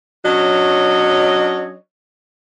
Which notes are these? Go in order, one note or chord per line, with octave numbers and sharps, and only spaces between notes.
F#3 C#4 D4 C#5 D#5